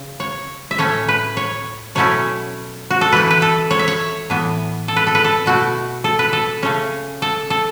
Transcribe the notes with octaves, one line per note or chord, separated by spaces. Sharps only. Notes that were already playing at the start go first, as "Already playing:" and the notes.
Already playing: C#3
C#5
E5
A2 A3 C#4 C#5
B4
C#5
B2 F#3 A3 C#4 E4 C#5
F#4
A4
E3 A3 E4 B4
B4
A4
C#5
E5
C#5
A2 E3 B3
A4
B4
A4
B4
A4
B2 A3 E4 F#4
A4
B4
A4
C#3 A3 C#4 C#5
A4
A4